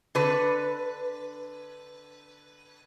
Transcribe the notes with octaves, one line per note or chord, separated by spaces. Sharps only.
D3 B4